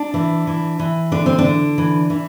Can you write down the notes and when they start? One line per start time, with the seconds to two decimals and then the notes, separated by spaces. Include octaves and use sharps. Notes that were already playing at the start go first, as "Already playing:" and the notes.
Already playing: D4
0.14 E3
0.47 E3
0.79 E3
1.12 D3 D4
1.26 C4
1.39 D4
1.44 D3
1.78 E3
2.10 E3